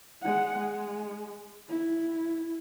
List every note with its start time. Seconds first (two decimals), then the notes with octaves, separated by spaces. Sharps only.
0.22 G#3 F#5
0.58 G#3
1.69 E4